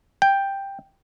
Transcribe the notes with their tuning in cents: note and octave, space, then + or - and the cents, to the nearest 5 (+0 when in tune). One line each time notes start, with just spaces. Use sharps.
G5 +5